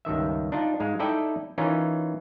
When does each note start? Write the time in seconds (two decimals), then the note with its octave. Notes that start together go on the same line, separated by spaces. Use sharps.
0.05 C#2 G2 D#3 E5
0.52 D4 D#4 F4
0.80 G#2 G#3 F5
0.99 D#4 E4 A4 D5 D#5 G5
1.58 E3 C#4 D#4 F4 A#4